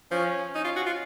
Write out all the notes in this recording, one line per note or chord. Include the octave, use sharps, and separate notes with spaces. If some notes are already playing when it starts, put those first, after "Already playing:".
F3 C#4
C#4 D#4
F4
F#4
F4